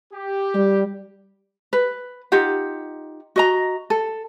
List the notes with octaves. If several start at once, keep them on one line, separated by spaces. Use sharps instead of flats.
G4
G3
B4
D#4 F4 G4 F#5
F#4 D#5 A#5
A4